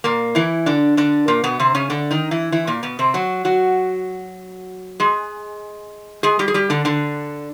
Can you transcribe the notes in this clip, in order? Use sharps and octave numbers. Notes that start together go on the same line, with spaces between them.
A#2 A#3
E3 E4
D3 D4
D3 D4
A#2 A#3
B2 B3
C3 C4
C#3 C#4
D3 D4
D#3 D#4
E3 E4
E3 E4
A#2 A#3
B2 B3
C3 C4
F#3 F#4
F#3 F#4
G#3 G#4
G#3 G#4
G3 G4
G#4
G3 G4
D3 D4
D3 D4